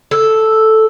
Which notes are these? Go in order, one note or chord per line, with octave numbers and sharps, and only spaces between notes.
A4